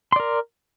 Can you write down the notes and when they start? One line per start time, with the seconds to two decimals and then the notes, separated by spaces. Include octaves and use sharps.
0.12 C6
0.16 D5
0.20 A#4